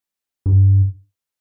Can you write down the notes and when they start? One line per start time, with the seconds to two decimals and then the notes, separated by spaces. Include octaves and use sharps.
0.46 G2